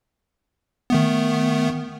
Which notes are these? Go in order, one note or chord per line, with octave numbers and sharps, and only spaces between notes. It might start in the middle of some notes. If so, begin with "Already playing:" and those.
D#3 A3 B3